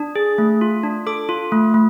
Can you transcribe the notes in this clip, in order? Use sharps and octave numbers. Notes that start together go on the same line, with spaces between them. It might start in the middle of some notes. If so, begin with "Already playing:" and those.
Already playing: D4
G#4
A3
F4
D4
A4 D6
F4
A3
A3